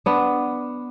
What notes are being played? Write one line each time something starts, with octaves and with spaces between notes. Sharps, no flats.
B3 D4